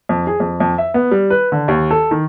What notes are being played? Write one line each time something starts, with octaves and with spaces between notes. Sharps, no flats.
F2
G#4
F2
F2
E5
B3
G3
B4
D3
D#2
A4
D#3